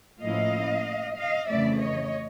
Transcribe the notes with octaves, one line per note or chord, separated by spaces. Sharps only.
A2 F3 A#3 C#4 E4 D#5 F5
D#5 F5
F2 C#3 E3 A3 D5 E5
C#5 D#5